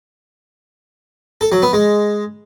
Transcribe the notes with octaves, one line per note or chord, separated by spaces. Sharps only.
A4
F#3
B3
G#3